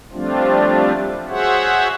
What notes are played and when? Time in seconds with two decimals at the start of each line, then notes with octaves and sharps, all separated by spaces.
0.13 F3 G3 A3 C4 D4 F4
1.28 F#4 G#4 C5 C#5 E5 F#5